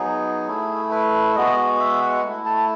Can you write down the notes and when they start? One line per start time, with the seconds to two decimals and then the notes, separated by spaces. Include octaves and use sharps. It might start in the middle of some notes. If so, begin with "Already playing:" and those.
Already playing: F#3 B3 D#4 G#4
0.48 A3 E4
0.92 B4
1.36 G#3 B3 F#4 D#5
1.80 E5
2.02 F#5
2.24 A3 E4
2.46 A5